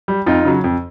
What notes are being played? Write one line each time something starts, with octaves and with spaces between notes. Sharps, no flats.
G3
F2 D#4 F4
C#3 F#3
F2